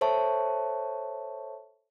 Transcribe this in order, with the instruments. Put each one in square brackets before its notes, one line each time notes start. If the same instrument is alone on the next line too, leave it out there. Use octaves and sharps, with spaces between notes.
[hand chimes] A4 C5 C#5 E5 A5 C#6